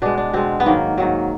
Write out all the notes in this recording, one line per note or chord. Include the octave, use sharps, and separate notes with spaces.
B2 G#3 D4
D4
B2 G#3 C4
B3
G#2 D#3 F#3 A#3
G#2 D#3 F#3